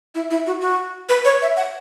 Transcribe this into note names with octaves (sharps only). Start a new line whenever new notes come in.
E4
E4
F#4
F#4
B4
C#5
E5
F#5